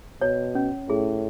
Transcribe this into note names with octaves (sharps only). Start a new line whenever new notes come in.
B2 C#5
C#4
A2 G#4